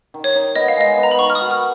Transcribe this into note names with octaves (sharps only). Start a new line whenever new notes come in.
D#3
C#5
D#4
B3 D#5
F5
G#3 D#5
B3
A#5
B5
D#3 C#6
F6
D#6
F#4
F6